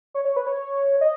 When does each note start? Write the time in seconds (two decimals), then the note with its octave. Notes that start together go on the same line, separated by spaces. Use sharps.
0.14 C#5
0.25 C#5
0.36 B4
0.47 C#5
1.01 D#5